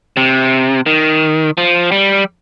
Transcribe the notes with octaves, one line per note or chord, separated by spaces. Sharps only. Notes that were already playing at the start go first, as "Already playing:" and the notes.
C3
D#3
F3
G3